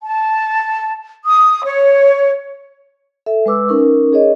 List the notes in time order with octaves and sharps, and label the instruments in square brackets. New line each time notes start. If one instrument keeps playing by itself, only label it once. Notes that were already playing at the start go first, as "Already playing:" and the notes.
[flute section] A5
D#6
C#5
[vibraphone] A4 E5
G#3 B4 D6 E6
C#4 D#4 A#4 C#6
G#4 C#5 D#5